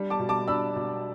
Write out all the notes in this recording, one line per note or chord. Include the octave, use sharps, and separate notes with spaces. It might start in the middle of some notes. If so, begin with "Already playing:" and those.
Already playing: G3 D4
A5 D6
B2
A5 D6
D4 B5 E6
B2